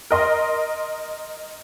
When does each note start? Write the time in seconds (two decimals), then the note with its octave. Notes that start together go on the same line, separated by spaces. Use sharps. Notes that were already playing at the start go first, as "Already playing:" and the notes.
0.11 A#4 D#5 C6